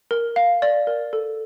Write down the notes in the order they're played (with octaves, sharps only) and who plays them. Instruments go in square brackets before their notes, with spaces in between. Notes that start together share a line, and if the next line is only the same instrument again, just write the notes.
[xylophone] A#4
F5
D5
A#4
A4